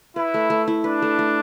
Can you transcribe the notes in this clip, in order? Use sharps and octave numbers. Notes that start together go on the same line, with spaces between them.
E4 B4
A3
A3
E4
D4 B4
A3
A3